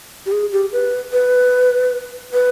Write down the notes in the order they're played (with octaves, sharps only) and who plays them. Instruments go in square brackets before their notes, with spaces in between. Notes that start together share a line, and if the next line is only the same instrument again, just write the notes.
[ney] G4
G#4
G4
B4
B4
B4